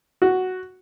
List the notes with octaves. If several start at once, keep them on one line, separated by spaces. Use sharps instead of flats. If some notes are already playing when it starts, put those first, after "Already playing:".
F#4